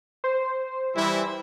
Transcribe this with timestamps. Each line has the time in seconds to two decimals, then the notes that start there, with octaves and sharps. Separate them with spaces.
0.24 C5
0.96 E3 G3 E4